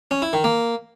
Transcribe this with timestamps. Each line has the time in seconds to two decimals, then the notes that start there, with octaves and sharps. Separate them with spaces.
0.11 C#4
0.22 E4
0.33 D#3
0.44 A#3